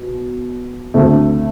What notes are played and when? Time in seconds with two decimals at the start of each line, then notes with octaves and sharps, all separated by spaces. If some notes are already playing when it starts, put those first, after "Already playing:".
Already playing: B2
0.94 D2 D3 A3 C4